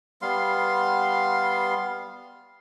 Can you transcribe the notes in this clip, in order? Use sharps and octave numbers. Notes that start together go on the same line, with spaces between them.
G3 B3 F5 C6